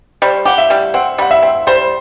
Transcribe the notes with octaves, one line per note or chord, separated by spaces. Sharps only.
G3 C5
G4 F#5
E5
G3
C4 F#5
G3 F#5
E5
C4
G3 C5